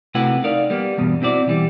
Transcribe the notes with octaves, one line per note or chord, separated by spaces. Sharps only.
C3 A3 E4 F#4 B4 F#5
D#4 A#4 D5 F5
G3 A#3 B3
E2 G2 B2
C4 E4 F#4 D5
B2 E3 G3